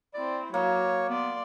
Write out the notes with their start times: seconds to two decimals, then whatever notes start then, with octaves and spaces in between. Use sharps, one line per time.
0.14 C4 E4 D5
0.54 F#3 A#3 C#5
1.10 B3 D5 C6